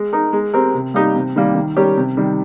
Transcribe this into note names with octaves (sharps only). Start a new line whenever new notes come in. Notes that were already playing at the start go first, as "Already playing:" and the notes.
Already playing: G#3
D#4 A#4
G#3
C4 G4 A#4
C3
G3 A#3 D#4 G4
C3
D#3 G3 A#3
D#3
G3 C#4 G4 A#4
C3
D#3 G3